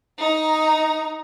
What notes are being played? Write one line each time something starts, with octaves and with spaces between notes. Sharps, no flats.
D#4 A#5